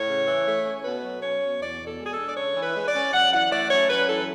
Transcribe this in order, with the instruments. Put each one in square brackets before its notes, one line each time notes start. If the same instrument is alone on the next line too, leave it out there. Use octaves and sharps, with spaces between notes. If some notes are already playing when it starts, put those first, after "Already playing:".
Already playing: [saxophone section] A2 C#5
C#3
E3
A3
C#4
B2 B4
F#3
C#4 C#5
B2
E2 D5
B2
A4
G#3
G#4
A4
D4
D5
C#3 C#5
E3
B4
G#3
D5
C#4
F#2 F#5
E3 F#5
A3 D5
F#2 C#5
F#2 B4
E3 A4